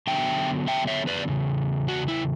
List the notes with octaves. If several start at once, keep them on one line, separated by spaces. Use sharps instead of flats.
D3 F#3 B3 D4 E5 G5
E5 G5
C#5 E5
B4 D5
E2 C#3
F#4
E4